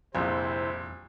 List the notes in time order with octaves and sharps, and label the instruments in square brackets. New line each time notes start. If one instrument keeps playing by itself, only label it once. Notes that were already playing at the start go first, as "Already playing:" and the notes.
[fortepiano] A#1 [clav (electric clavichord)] F2 G3 [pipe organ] C3 E4 [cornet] C5